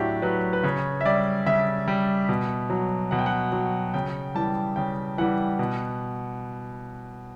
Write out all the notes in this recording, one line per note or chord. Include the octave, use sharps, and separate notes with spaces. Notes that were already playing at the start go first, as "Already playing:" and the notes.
Already playing: A2 F#3 D4 E4 F#4 G4
F#3 B4
B4
C#3 C#5
E5
G3 D5
C#3 E5
G3
B2
F#3
B2 F#5
G5
F#5
F#3
C#3 G5
E3 G3 A5
C#3 G5
E3 G3 F#5
B2